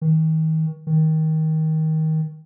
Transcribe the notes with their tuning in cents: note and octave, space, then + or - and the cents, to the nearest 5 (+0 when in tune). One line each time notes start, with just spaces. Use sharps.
D#3 +35
D#3 +20